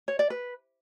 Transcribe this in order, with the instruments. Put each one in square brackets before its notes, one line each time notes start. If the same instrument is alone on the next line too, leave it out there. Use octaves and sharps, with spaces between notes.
[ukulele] C#5
D5
B4